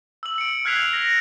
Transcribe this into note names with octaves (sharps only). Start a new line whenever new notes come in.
E6 F#7
C#7 D7
F6 F#6 G#6 B6 C7 F7
A#6